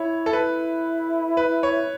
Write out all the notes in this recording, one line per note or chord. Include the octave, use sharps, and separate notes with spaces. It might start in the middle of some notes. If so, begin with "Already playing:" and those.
Already playing: E4 C#5
A4
E4 B4
B4
C#5